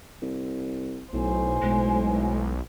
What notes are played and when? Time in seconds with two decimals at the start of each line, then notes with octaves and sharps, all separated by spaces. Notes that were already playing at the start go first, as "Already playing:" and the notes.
0.22 C2
1.13 B1 A2 C5 G#5
1.62 B1 G#3